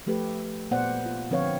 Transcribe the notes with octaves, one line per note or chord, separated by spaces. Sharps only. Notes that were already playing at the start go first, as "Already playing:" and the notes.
F3 A3 G4 A4 B4
A#2 B3 C5 D5 F#5
F4
D3 F3 C4 B4 C#5 F5